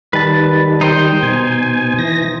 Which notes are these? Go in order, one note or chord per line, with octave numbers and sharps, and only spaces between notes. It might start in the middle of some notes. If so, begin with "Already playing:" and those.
D#3 G3 B4 A5
D#4 C5 G5
B2 G#5
E3 A#6